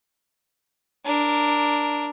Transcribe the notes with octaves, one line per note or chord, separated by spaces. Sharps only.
D4 A#4